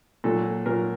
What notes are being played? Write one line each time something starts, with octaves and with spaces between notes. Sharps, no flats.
A#2 F#3 A4
A#2 F#3 A#4